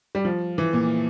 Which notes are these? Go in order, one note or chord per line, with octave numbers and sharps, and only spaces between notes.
G3
F3
E3
A#2